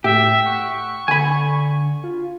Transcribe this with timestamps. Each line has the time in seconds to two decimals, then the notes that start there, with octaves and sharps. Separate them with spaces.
0.04 A2 G4 E5
0.45 F#5 C#6
1.08 D3 G#5 B5
2.04 F4